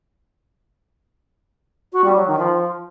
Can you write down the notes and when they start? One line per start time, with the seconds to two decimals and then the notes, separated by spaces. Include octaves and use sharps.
1.93 F#4
2.04 G3
2.16 F#3
2.27 D#3
2.38 F3